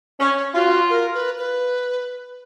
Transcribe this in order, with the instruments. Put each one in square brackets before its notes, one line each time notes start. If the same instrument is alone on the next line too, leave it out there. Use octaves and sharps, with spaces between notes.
[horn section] C#4 [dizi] C#5
[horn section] F4 [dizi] F#4
[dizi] A#4
B4
B4